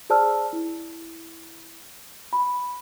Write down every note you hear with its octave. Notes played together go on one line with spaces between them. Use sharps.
G#4 C5 D5 A5 E6 F6
E4
B5